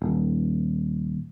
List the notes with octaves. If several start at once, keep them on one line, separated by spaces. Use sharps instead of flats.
D#1